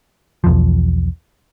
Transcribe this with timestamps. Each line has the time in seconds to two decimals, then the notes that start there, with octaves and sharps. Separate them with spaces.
0.44 B1 E2 F3